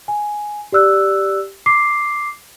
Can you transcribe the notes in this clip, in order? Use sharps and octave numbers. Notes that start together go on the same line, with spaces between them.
G#5
G4 D5 E6 F#6
D6 C7